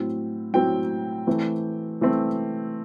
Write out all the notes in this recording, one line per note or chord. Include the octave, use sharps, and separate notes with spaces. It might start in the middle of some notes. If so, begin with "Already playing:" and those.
Already playing: A2 F#3 C4
A2 F#3 C4 G5
E3 A3 C4
E3 A3 C4